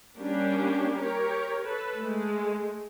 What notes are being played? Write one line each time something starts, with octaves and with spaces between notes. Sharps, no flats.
G3 A#3 C#4 D4 G4
G4 A#4 C#5
A4 B4
G#3 A3